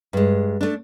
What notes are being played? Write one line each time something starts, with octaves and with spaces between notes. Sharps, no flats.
G2 G#3
A3 D4